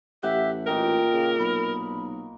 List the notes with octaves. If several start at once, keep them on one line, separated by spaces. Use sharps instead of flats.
A1 G4 E5 F#5
A#2 D#4 A#4 G5
C#3
B1 B5